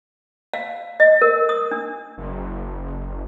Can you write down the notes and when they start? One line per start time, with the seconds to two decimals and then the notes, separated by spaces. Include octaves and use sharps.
0.54 F5
1.00 D#5
1.22 A#4
1.49 D#6
1.71 D4
2.18 F#1